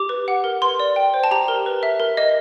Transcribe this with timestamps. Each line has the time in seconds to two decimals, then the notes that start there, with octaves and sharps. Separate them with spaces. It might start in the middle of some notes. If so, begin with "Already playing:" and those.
Already playing: G4 D6
0.09 B4
0.28 F#5
0.44 A#4
0.62 B4 C6
0.80 D5
0.96 G5
1.14 C5
1.24 A5
1.31 G4 A#5
1.48 A#4
1.66 B4
1.83 E5
2.00 A#4
2.17 D#5